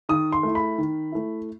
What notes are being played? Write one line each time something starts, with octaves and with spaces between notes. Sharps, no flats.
D#3 D#6
C6
A3 E4
B5
D#3
A3 E4